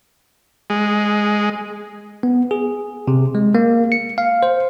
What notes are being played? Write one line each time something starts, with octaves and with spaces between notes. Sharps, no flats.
G#3
B3
G#4
C3
G#3
A#3
C#7
F5
C5